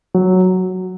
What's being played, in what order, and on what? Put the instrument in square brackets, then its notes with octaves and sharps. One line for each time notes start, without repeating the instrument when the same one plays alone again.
[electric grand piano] F#3